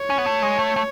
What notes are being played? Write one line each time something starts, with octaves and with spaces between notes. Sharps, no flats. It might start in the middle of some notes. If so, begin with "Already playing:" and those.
Already playing: C#5
C#4
B3
A3
G#3
A3
A3